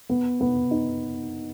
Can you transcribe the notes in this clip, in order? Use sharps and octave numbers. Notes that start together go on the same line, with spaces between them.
B3
B3
D#4